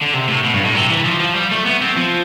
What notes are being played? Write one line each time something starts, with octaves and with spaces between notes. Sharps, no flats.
D3
C3
A2
B2
G2
A2
C3
E3
F3
F3
G3
A3
B3
C4
F3